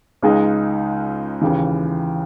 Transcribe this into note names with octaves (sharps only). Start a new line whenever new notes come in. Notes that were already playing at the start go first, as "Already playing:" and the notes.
C#2 C#3 G#3 D#4
D#2 C#3 E3